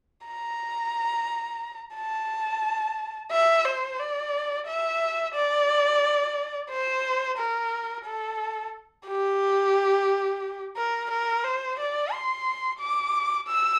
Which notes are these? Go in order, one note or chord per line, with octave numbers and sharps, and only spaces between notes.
A#5
A5
E5
C5
D5
E5
D5
C5
A#4
A4
G4
A#4
A#4
C5
D5
C6
D6
E6